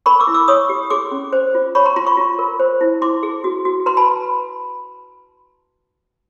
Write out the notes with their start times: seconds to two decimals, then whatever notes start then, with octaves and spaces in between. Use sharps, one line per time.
0.06 A#4 B5 C#6
0.20 D6 E6
0.27 E4
0.34 D6 E6
0.48 C#5 C#6 D#6
0.69 G4
0.90 G#4 C6 D6
1.11 C#4
1.33 C5
1.55 F4
1.75 C#5 B5 C#6
1.86 A#5 C6
1.96 F4 A#5 C6
2.07 B5 C#6
2.17 F4
2.39 A#4
2.60 C5
2.81 E4
3.02 E4 C6 D6
3.23 G#4
3.44 F#4
3.65 F#4
3.86 B4 A#5 C6
3.97 A5 B5